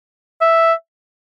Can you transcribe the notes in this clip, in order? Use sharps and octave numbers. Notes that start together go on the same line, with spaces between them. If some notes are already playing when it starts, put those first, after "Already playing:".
E5